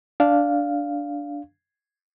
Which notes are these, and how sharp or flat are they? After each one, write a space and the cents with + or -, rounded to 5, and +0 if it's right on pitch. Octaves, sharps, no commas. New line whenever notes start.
D4 -10 F5 +0